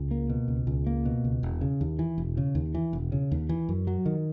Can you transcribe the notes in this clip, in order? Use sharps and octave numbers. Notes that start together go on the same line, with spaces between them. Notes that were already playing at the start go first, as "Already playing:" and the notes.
Already playing: C#2
A#3
B2
C#2
C#2
A#3
B2
C#2
E1
C#3
D#2
E3
E1
C#3
D#2
E3
E1
C#3
D#2
E3
F#2
F#3
D#3